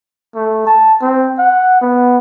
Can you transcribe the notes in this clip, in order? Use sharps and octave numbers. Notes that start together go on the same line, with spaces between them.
A3
A5
C4
F#5
B3